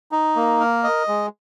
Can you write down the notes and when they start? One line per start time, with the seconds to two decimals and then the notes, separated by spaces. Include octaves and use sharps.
0.12 D#4
0.36 A#3
0.60 A#4
0.84 D#5
1.08 G#3